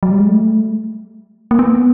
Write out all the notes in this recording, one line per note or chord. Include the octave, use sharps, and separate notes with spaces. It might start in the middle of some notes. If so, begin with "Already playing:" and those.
F#3
G3
G#3
A3
A#3
B3